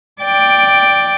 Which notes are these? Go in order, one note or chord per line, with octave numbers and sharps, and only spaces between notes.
D5 G5